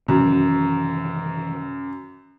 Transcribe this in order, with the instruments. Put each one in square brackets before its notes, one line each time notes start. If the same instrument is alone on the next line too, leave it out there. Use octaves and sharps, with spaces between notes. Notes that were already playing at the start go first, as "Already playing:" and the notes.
[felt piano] F#2 [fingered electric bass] C3 D#3 E3